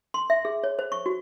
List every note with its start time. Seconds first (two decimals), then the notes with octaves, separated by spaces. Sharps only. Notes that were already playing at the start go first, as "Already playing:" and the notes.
0.14 C6
0.30 E5
0.45 G#4
0.64 C#5
0.79 C5
0.92 C#6
1.06 F#4